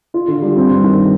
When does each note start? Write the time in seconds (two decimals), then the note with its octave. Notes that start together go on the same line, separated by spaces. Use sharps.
0.14 F4
0.28 D3
0.42 G3
0.56 C4
0.69 G2
0.83 D#3